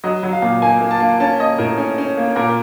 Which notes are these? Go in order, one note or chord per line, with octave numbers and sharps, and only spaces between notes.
F#3 D#5
F#3
F5
A#2
A#3 G#5
A#3
A5
A#3
C#4 A5
A#3 D#5
A2 A#4
C#4
C#4
A#3
A#2 A#4